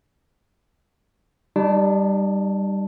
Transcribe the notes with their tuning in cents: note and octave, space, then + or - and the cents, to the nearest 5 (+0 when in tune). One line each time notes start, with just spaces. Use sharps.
G3 +0 D#4 -35 A5 +0